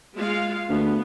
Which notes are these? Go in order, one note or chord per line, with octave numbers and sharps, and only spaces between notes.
G#3 F4 F5
D2 B3